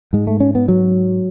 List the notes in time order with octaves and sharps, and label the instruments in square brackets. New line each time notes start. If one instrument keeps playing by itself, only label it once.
[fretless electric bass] G#2 G#3
A3
C#4
B3
F#3